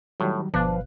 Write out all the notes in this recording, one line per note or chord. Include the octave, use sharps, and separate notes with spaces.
A2 D#3 F#3 G3
G1 B2 F3 D4 B4 F5 F#6